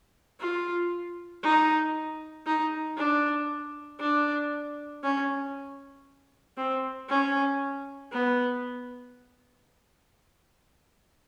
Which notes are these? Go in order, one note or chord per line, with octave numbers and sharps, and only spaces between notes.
F4
D#4
D#4
D4
D4
C#4
C4
C#4
B3